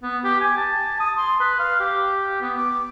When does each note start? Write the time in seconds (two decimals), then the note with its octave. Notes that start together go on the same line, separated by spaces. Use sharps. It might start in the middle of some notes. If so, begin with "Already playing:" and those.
0.03 B3
0.24 G4
0.41 G#5
0.57 A5
1.00 D#6
1.17 C6
1.40 B4
1.59 F5
1.80 G4
2.42 B3
2.57 D6